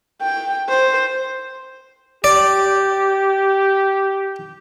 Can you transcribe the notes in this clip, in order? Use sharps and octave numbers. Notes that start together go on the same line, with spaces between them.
G5
C5
G4 D5